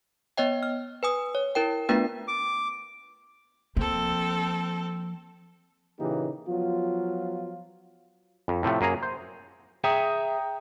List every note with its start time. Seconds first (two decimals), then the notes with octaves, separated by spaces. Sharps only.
0.37 B3 C#5 D#5 G5
0.63 F6
1.03 B4 G#5 D#6
1.35 C#5
1.55 E4 A#4 G5
1.89 A3 B3 D4 F4 B4 G5
2.28 D6
3.77 F3 A#3 C4 A4
6.00 A#2 C#3 E3 A#3 D#4 G4
6.48 F3 F#3 B3 F4
8.48 F2
8.63 A2 C3 F3 A3
8.81 F#2 A#3 G#4 A#5
9.03 C5
9.84 G#4 C#5 E5 G5 A#5 D#6